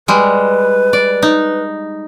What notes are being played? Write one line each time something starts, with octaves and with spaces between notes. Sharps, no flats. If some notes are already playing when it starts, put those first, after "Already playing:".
G3 G#3 B4
D5
D#4